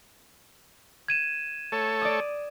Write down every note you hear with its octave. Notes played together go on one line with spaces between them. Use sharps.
G#6 D#7 E7
A3 A4 C#5
D5 D#6